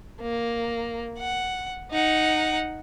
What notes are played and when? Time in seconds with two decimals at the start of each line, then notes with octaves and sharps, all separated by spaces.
0.21 A#3
1.19 F#5
1.91 D#4 F#5